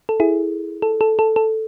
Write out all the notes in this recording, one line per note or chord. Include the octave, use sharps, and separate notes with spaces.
A4
E4 G#4
A4
A4
A4
A4